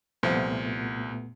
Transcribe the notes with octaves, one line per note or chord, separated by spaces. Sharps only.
C2 A#2 F3 A3 B3